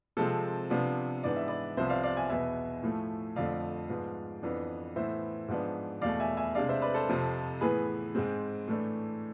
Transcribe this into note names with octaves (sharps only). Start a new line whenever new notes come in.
C3 F3 G#3 C4 A4
C3 F3 B3 D4
G#2 E3 B3 D4 D5
E5
B4 D5
C2 C3 F3 B3 C5 E5
D5 F5
D5 F5
E5 G#5
E2 B2 B3 E5 G#5
A2 F3 A3
F2 D3 F3 A3 D5 F5
G#2 F3 B3
F2 E3 B3 D4
A2 E3 B3 C5 E5
G#2 F3 B3 D4
E2 B2 A3 D5 F5
E5 G#5
E5 G#5
C3 G#3 D4 D5 F5
C5 E5
B4 D5
A4 C5
F2 C3 F3
A2 E3 B3 G#4 B4
G#2 G#3 C4
A2 E3 A3 D4